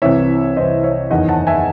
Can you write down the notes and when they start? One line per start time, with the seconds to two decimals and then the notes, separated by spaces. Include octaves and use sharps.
0.02 C2 C3 E3 C#5 E5
0.56 C2 C3 E3 C5 D#5
0.83 C#5 E5
1.10 F#1 E2 D#3 D#5 F#5
1.28 F#5 A5
1.47 E5 G#5